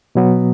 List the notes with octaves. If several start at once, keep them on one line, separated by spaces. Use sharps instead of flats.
B2 F#3 B3